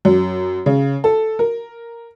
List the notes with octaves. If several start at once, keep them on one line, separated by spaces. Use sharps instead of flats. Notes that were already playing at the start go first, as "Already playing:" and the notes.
F#2
C#3
A4
A#4